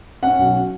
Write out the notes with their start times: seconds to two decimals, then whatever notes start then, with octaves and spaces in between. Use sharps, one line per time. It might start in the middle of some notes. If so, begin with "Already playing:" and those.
0.23 C#4 F#5
0.39 B1